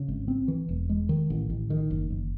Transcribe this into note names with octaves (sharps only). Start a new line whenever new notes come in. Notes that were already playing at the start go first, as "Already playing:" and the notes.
Already playing: C#3
G#1
C4
E3
E1
G#3
D#3
A1
A1
D#3
F#1
F#1